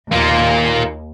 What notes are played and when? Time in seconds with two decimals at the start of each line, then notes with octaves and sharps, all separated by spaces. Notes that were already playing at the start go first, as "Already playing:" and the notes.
0.12 D#2 A#3 F4